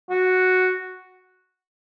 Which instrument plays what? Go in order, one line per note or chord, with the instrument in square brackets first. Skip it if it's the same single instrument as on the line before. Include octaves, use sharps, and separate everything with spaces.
[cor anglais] F#4